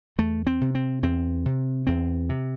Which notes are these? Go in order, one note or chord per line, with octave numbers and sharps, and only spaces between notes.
E2 A3
C4
C3
C4
E2 C4
C3
E2 C4
C3